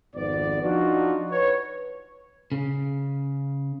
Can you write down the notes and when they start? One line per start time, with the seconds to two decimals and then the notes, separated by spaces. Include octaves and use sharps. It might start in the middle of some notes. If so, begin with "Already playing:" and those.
0.16 G#1 F2 B3 D5
0.62 F3 D4 D#4 F4 F#4
1.31 B4 C#5
2.52 C#3